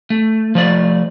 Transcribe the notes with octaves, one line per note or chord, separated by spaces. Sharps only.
A3
F3 A3 D5